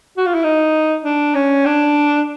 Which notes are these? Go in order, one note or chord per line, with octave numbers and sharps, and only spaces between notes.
F#4
F4
E4
D#4
D4
C#4
D4